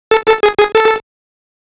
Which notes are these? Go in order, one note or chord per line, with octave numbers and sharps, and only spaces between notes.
A4
A4
G#4
G#4
A4